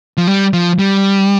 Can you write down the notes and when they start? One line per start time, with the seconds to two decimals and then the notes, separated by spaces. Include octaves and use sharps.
0.17 F3
0.28 G3
0.53 F3
0.79 G3